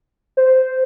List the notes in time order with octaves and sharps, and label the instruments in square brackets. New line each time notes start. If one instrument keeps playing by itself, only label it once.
[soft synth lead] C5